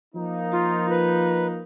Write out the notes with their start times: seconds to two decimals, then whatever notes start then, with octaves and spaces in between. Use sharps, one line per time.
0.15 F3 A#3 D#4
0.52 F4
0.89 B4